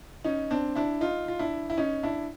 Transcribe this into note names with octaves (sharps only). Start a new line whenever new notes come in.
C#4 D#4
C4 D4
D4 E4
D#4 F4
F4
D4 E4
E4
C#4 D#4
D4 E4